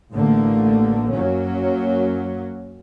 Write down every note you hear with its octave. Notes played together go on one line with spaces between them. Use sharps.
A1 D3 A3 A#3
F#2 F#3 A#3 C#4